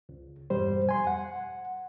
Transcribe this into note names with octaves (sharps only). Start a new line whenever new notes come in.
C#2
E2 G2 B2 G3 C5
F2 G#5 C6
F#5